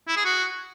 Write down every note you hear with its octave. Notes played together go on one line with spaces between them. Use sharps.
E4
G#4
F#4